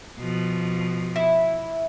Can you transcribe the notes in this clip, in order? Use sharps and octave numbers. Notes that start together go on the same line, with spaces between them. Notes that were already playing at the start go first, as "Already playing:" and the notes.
B2 F3
E4